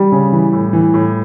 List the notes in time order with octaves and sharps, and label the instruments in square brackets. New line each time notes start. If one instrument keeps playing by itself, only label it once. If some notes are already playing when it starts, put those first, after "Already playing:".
Already playing: [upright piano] G3
[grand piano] C#3
E3
A2
E3
A2